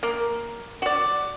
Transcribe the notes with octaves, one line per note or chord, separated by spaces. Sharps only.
A#3
F#4 D5